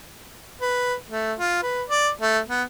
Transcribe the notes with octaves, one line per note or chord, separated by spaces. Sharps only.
B4
A3
F4
B4
D5
A3
B3